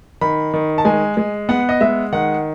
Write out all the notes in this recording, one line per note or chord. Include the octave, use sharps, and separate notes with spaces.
D#3 B5
D#3
A5
G#3 G#5
G#3
B3 F#5
D#5
G#3 E5
D#3 F#5